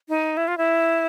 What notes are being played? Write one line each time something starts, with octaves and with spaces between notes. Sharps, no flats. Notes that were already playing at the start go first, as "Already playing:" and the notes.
D#4
E4
F4
E4